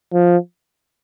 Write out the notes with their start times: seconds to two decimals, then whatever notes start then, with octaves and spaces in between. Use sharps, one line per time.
0.13 F3